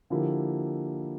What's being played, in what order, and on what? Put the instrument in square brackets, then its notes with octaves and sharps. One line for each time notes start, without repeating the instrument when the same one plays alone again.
[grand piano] D3 F3 A#3 E4 G4